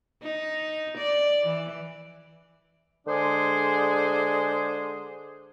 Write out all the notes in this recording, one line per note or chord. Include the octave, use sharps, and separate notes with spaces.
D#4
D5
E3
D3 G#3 D4 G#4 C5